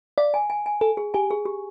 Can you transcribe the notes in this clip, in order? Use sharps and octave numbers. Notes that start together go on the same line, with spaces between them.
D5 F5
G#5
G#5
G#5
A4 G#5
G#4
G4 G#5
G#4
G4